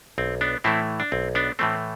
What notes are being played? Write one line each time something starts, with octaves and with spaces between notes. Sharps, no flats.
B1 C4
B3 D4
A2 E3 A3 C4 E4
D4
B1 C4
B3 D4
A2 E3 A3 C4